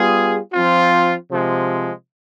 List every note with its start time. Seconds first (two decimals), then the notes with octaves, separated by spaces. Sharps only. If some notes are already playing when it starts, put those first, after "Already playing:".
Already playing: G3 B3 F4 G#4
0.53 F3 C4 F4
1.29 C3 F3 G#3